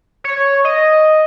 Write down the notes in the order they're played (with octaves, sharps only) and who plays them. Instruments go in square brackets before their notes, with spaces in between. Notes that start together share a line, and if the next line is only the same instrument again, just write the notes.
[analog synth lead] C#5
D#5